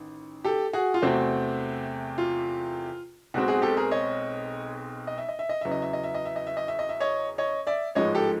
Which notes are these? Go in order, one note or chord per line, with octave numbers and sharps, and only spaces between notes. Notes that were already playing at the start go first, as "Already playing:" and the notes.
Already playing: A1 D#3
G4 A4
F#4 G#4
F4
E2 C3 E3 A3 C4 F#4
F4
B1 B2 G#3 C4 F#4
F#4 G#4
G4 A4
G#4 A#4
C#5 D#5
D#5
E5
D#5
E5
D#5
E2 C#3 F#3 B3 E5
D#5
E5
D#5
E5
D#5
E5
D#5
E5
D#5
E5
D#5
E5
C#5 D#5
C#5 D#5
D5 E5
A1 G#2 F3 G#3 C#5 D#5
G4 A4